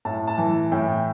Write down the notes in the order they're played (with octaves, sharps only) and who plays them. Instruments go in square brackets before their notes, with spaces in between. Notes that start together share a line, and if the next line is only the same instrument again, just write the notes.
[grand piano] A2 A5
A5
E3
A2 G5